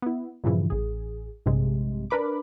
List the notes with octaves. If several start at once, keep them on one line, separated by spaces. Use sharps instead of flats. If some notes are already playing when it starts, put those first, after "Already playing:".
B3 E4
G2 A#2 C#3 E3 F3
A1 G#4
A#1 G2 C3 G#3
D4 A#4 B4 B5 D6